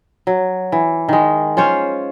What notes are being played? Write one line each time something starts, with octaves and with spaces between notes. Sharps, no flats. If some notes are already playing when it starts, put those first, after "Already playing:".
F#3
E3
D#3 G#3
C#4 F4 C5 C#5